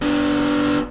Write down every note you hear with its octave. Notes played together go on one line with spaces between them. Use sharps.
B3 D4